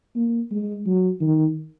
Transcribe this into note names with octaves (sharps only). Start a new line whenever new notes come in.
A#3
G#3
F#3
D#3